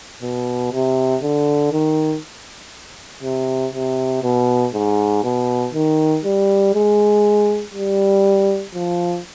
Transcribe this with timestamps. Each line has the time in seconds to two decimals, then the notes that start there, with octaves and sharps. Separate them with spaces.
0.22 B2
0.72 C3
1.22 D3
1.72 D#3
3.23 C3
3.74 C3
4.23 B2
4.74 G#2
5.23 B2
5.74 D#3
6.25 G3
6.74 G#3
7.74 G3
8.75 F3